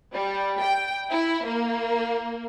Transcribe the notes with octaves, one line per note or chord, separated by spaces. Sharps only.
G3
G5
E4
A#3